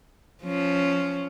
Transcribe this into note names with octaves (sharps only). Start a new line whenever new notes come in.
F3 C#4